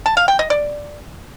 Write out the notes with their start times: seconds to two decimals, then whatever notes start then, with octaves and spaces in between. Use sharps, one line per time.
0.06 A5
0.17 F5
0.28 G5
0.39 D#5
0.50 D5